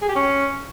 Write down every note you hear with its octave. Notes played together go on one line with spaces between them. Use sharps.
G#4
G4
C#4